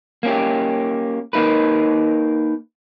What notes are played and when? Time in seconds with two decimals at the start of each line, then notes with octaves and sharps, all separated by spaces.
0.23 A#3 C#4 G4
1.33 A#3 D#4 A#4 B4